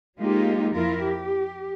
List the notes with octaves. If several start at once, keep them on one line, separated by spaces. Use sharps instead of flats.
F#3 G#3 A#3 D#4 F4 G4
F2 F3 E4 F4 A#4
G4